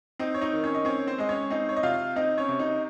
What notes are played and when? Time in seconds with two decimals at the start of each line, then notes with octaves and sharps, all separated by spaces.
0.19 C4 D#4 D#5
0.34 C#5
0.41 D#4 D#5
0.53 D#3
0.63 C#4 C#5
0.75 D#5
0.85 C4 C#4 C#5
1.07 C4 C5
1.18 G#3 D#5
1.29 C#4 C#5
1.50 C4 D#4 D#5
1.69 C#5
1.76 D#5
1.83 C3 F4 F5
2.16 C4 D#4 D#5
2.38 C#4 C#5
2.49 C3
2.59 D#4 D#5